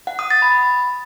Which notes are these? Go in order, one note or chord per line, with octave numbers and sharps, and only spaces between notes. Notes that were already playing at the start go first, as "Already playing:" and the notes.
F#5
D#6
A6
B5